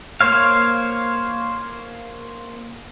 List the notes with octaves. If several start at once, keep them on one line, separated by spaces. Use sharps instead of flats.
A#3 C5 C#5 F5